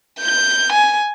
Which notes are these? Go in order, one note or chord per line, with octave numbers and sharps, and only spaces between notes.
G6
G#5